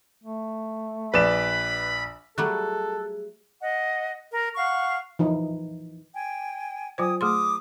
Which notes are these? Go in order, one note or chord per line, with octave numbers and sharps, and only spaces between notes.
A3
A#1 B4 D5 B5 E7
F#3 G3 A3 G#4 A4 F#6
D#5 F#5
A#4
F5 F#5 C#6
E3 F3 D#4 E4
G5 G#5
F#3 F4 C5 G5 G#5 D#6
A3 G#4 C6 D6 D#6